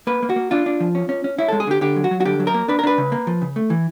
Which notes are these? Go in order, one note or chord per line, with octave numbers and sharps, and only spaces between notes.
A#3 B4
A#3
F#4
A#3
D4 F4
D4
F3
C#4
C#4
C#4
C#4 E4
G#3 A4
G#4
D3 G4
D3 G4
F#3
F#4
F#3
F#4
D3 G4
F#3
A#4
A#3
D4 B4
A#4
D4 B4
C#3
A#3
F3
C#3
A3
E3